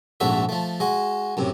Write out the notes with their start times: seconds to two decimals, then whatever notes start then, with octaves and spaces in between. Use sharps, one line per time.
0.20 A#1 F2 G#2 A3 F#4 E5
0.49 F3 A3
0.80 G#3 F#4
1.37 F#2 A2 C3